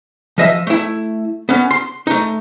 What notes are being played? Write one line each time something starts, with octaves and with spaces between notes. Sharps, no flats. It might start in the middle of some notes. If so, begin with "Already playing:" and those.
F3 D#5 E5
A3 E4
B3 C#4
C6
A3 D#4